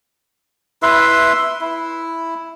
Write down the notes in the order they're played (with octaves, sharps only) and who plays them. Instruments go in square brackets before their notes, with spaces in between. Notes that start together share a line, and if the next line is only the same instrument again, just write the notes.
[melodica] E4 B4 E5 C6
E4